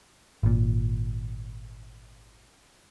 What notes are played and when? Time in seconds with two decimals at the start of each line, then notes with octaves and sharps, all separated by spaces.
0.43 G#1 A#2